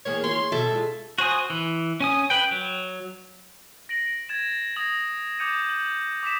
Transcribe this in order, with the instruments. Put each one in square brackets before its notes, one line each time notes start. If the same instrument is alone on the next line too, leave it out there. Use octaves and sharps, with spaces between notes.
[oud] E2 A#3 G#4 [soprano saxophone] C#5
[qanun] C#5 [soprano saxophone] C6
[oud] B2 [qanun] A4 [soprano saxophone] E5
[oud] G#3 F4
[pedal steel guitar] F#4 C5 G#5 D#6
E3
C#4 G#5 D#6
B4 G5
F#3
[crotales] A#6 D7 F#7
G#6 A6 E7
D#6 G#6 A#6 F#7
D6 D#6 G6 C#7 D#7
G6 F#7
D6 D#6 B6 E7